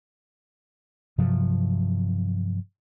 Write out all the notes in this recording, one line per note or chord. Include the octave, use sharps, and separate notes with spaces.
G2 C3 F3 F#3